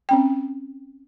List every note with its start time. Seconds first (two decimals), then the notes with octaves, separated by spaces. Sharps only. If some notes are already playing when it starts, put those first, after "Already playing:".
0.09 C4 C#4 G5